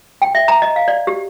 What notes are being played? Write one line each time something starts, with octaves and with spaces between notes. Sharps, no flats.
G5
E5
A#5
D#5
F5
D5
G4